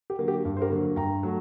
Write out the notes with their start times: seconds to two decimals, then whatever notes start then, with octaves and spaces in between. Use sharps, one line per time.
0.10 G4
0.19 D3 F#3 A#3
0.28 G4
0.45 G2
0.57 C5
0.62 G4 A#4
0.70 D3 F#3 A#3
0.96 G2 G5 A#5
1.23 F#3 A3